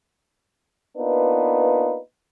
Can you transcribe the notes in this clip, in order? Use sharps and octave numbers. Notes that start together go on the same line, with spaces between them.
A#3 B3 D4 D#4 F4 B4